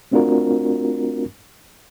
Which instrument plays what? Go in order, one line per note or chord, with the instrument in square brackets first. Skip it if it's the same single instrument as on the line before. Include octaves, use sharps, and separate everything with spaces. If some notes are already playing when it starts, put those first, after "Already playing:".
[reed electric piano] A3 C4 D4 F4 F#4 A#4